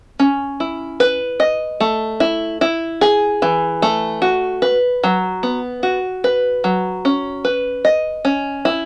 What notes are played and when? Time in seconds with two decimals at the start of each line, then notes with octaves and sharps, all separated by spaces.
0.20 C#4
0.60 E4
1.00 B4
1.40 D#5
1.80 A3
2.20 E4
2.61 E4
3.01 G#4
3.42 E3
3.82 A3
4.22 F#4
4.62 B4
5.04 F#3
5.43 B3
5.83 F#4
6.24 B4
6.64 F#3
7.05 C#4
7.45 B4
7.85 D#5
8.25 C#4
8.65 E4